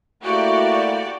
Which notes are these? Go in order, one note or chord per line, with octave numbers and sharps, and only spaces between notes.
A3 A#3 E4 F#4 G4 D5